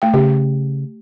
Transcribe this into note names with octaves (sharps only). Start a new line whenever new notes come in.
A3 G5
C#3 G4